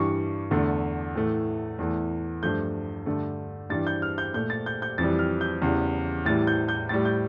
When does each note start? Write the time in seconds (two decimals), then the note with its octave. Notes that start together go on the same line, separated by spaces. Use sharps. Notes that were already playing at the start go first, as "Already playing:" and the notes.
Already playing: G2 E3 G3 C#6
0.51 E2 D3 A3
1.15 A2 E3 A3
1.79 E2 E3 A3
2.43 G2 F3 A3 G6
3.06 G2 D3 A3
3.70 G2 E3 G3 A6
3.87 G6
4.02 F6
4.18 G6
4.34 A#2 A3 G6
4.50 A6
4.66 G6
4.82 G6
4.98 F2 E3 G3 A6
5.19 F6
5.41 G6
5.62 E2 C#3 E3 G3
6.25 A2 E3 G3 A6
6.47 G6
6.68 G6
6.89 A2 G3 A6
7.05 G6